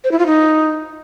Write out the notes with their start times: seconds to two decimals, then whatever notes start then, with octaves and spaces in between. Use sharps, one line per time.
0.04 C5
0.12 E4
0.19 F4
0.26 D#4